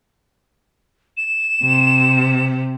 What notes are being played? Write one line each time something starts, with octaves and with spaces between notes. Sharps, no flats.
E7
C3